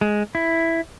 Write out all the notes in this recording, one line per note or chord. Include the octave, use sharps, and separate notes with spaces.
G#3
E4